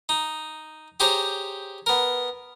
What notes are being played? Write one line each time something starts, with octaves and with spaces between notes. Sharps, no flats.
D#4
G4 G#4 C5 C#5 A#5
B3 A#4